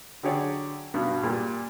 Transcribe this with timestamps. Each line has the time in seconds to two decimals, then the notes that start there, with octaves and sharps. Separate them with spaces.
0.23 D3 F#3 G4 G#4 C#5 D5
0.94 G2 B2
1.23 A#2 G3